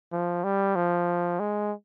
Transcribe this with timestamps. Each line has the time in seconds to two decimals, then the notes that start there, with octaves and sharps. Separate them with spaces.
0.12 F3
0.44 G3
0.76 F3
1.39 G#3